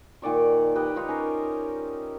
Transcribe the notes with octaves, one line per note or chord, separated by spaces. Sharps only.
A#2 D#3 D5 C#6
G4 B4 D#5
D#4 F4 C#5
C#4 A#4